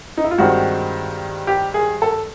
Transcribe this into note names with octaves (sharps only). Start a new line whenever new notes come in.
D#4
E4
F4
G2 D#3 G#3 C4 F#4
G4
G#4
A4